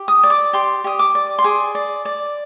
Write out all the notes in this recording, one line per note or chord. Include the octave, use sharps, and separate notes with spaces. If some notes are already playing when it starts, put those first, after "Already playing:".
Already playing: G4
D#6
D5
D6
G4 C6
G4 D#6
D6
D5
C6
G#4 D6
D5
D5